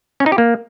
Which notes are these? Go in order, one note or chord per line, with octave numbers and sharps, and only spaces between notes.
C#4
D#4
G4
A#3